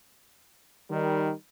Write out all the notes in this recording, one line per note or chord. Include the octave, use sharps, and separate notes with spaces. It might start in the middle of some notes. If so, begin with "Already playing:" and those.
D#3 G3